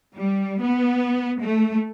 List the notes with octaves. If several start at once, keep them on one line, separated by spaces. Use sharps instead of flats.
G3
B3
A3